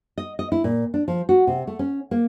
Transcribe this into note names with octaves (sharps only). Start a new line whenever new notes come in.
D#5
D#5
E4
A#2
D4
F3
F#4
C3
A3
C#4
A#3